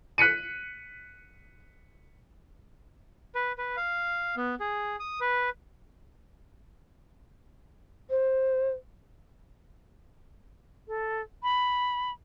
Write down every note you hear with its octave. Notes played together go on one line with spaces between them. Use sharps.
F#6 B6 C#7 D#7
B4
B4
F5
B3
G#4
D#6
B4
C5
A4
B5